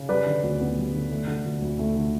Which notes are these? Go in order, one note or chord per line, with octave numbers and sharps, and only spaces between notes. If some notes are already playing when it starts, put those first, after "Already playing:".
Already playing: C#3
G3 B4 D5
D3
D2
B3
G3
D3
A3
D3
D2
D2
A3
D3